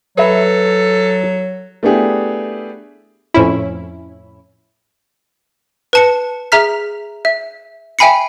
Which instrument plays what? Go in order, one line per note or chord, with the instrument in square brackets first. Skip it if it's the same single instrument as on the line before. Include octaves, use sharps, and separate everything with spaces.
[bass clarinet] F#3 [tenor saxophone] A4 [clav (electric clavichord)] B4 E5
[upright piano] A3 B3 D4 E4 G4 G#4
[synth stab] F2 A2 C#4 E4
[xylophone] B4 A5 C#7
G#4 E5 A#5 F6 B6
E5
E5 G5 G#5 B5 C7 C#7